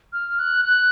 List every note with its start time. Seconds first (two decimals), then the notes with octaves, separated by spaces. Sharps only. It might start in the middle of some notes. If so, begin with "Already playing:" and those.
0.13 F6
0.39 F#6
0.65 F#6